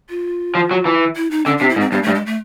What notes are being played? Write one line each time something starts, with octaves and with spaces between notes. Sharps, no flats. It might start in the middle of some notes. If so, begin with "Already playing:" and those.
F4
F3
F#3
E3
E4
D#4
D3 C#4
C3 D4
E4
G#2
C4
G2 B3
G2 A3
G#3
A3